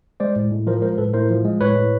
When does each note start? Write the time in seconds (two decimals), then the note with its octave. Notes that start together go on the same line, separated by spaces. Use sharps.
0.20 G#3 C5 D5
0.36 A2
0.52 A2
0.67 F3 A#4 C5
0.82 G#3 A#4 C5
0.98 A2 A4 B4
1.13 A2 A#4 C5
1.30 F3
1.45 G#3
1.61 A2 B4 C#5
1.76 A2